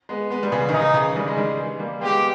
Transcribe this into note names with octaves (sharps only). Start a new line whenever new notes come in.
G#3 B3
G#3 B3
G3
C#3 E3
D#3
C#3 D#4
C#3 E3
D#3 G3
G#3
D#3 G3
E3 G#3
G3 A#3
G#3 B3 G4